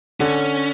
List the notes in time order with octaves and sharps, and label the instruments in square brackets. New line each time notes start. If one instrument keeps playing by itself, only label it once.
[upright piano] D3 [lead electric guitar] C#4